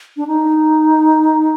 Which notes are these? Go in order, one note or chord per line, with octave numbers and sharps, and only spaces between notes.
D4
D#4